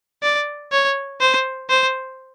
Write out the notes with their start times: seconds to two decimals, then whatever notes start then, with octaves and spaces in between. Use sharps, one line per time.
0.23 D5
0.72 C#5
1.21 C5
1.70 C5